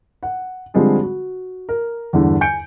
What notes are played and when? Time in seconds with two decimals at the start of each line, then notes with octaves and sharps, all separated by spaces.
0.23 F#5
0.74 D3 F3 G3 G#3 C4 G#4
1.03 F#4
1.69 A#4
2.13 E2 G2 D3 E3
2.41 G#5 G6 C#7 D7